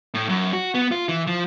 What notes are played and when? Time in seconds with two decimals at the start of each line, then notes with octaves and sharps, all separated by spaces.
0.14 A2
0.29 F#2
0.53 F#4
0.75 B3
0.92 F4
1.09 E3
1.27 F3